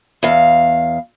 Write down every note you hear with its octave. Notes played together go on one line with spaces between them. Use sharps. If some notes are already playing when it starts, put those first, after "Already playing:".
E2 F5